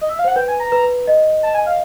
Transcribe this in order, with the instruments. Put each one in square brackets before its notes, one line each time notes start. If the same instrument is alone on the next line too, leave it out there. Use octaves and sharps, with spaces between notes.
[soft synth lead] D#5
E5
F5
[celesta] C5 [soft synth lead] F#5
[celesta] B4 [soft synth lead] G5
[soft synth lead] G#5
A#5
[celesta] B4
B4
D#5
[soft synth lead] A5
G#5
F5